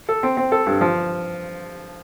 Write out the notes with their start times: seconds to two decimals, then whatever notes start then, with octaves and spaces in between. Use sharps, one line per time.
0.09 A4
0.23 C4
0.37 C4
0.52 A4
0.66 G2
0.81 F3